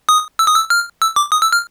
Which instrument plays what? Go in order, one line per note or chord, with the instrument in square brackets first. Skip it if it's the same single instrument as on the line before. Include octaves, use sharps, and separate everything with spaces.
[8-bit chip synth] D#6
E6
D#6
E6
F6
E6
D6
D#6
E6
F6